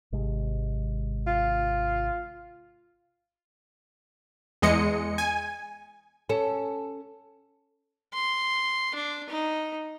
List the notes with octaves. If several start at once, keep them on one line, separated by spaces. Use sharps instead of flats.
G#1 C3 G#3
F4
E2 G#3 D#5 C#7
G#5
C#4 A4
C6
D4
D#4